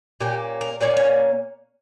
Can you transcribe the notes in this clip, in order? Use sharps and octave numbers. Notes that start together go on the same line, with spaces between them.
A#2 A#3 C#4 G4
A#4
A#2 A#3 C#4 D5
C#5